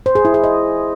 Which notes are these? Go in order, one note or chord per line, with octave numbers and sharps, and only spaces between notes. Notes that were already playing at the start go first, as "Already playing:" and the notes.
C5
G#4
E4
G#4
D#5